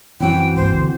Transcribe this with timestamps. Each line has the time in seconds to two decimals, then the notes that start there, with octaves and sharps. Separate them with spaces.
0.20 F#2 E3 C4 F#4 G5
0.56 G2 A#3 C5
0.73 D3